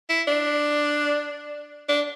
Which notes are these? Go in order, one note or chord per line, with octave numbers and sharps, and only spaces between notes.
E4
D4
D4